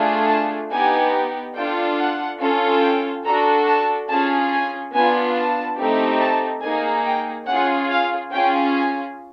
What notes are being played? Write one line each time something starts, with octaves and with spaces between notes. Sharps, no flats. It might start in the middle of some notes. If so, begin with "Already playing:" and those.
Already playing: A3 D4 F4 G#4
A5
B3 D#4 G4 G#5
D4 F4 A4 G5
F#5
C#4 F4 A4
G5
D4 F#4 A4 A#5
A5
C#4 F4 G#4 A5
G#5
B3 D4 F4 G#5
A5
A3 C4 D#4 G4
A5
A#3 D#4 G#4 G#5
G5
C#4 F4 G#4 F#5
F5
C#4 F4 G#4 G5
G#5